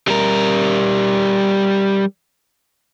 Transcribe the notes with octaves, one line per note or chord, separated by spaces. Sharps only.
G3 A#4